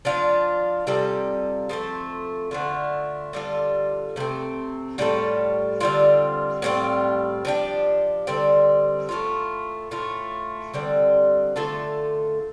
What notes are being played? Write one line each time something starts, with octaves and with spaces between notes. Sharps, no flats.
F3 D4 F4
C3 G3 F4 A4
F3 A3 C4 A4
D3 A3 F4
D3 G3 F4 A4
C3 A3 C4
A2 G3 F4 A4
D3 G3 C4 F4
A2 G3 C4 F4
F3 D4 G4
D3 G3 C4
A2 A3 F4
A2 A3 F4
D3 G3 C4
D3 A3 F4 A4